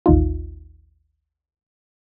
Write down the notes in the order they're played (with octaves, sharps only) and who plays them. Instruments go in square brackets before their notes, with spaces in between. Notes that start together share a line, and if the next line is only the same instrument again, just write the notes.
[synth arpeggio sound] A1 D#2 D#4 F4